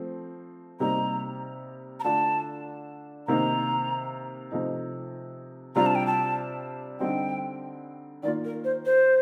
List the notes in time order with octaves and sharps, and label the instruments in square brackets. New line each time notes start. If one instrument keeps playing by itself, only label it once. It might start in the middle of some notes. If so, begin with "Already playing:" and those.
Already playing: [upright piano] F3 A3 C4
[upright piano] C3 G3 A#3 D#4 [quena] A#5
[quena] A#5
[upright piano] D3 A3 D4 F4 [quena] A5
[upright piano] C3 D#3 A#3 D#4 [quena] A#5
[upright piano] C3 F3 A3 D#4
[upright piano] C3 G3 D4 F4 [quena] A#5
[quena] A5
G5
A5
[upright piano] D3 G3 C4 D#4 [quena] G5
[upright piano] D#3 A#3 F4 [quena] D5
[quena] A#4
C5
C5